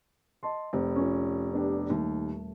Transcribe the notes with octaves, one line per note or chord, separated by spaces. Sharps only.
D#5 A5 C6
F1 C4
C#4 F4
B3 D4 G4
D#1 D#2 A3